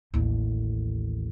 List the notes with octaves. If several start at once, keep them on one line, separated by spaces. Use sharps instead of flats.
A1 D#2